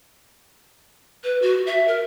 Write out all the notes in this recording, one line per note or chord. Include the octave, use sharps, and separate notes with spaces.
B4
F#4
E5
A#4